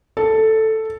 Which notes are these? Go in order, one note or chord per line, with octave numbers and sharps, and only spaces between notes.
A4